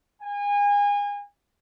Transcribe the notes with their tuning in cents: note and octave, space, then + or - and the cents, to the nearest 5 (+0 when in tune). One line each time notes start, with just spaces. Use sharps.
G#5 -30